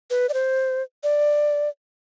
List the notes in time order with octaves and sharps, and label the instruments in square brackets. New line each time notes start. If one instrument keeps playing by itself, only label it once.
[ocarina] B4
D5
C5
D5